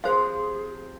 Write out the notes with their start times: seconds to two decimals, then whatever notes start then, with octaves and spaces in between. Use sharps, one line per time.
0.04 C3 F3 G#4 C5 F5 C6